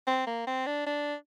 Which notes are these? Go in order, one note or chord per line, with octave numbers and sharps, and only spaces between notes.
C4
A#3
C4
D4
D4